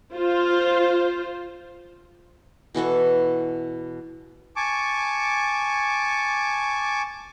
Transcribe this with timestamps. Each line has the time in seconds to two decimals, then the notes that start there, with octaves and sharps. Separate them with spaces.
0.14 F4 C5
2.74 B2 E3 F#4 A4
4.56 G#5 A5 C#6 D6